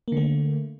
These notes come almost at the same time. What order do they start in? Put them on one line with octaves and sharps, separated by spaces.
A#3 D3 A3